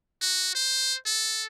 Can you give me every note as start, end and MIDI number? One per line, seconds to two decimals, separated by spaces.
0.21 0.54 66
0.55 0.96 72
1.06 1.46 69